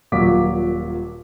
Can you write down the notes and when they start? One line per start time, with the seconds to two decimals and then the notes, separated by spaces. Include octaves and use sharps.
0.12 D#1 A#2 F#3 F5 D6 B6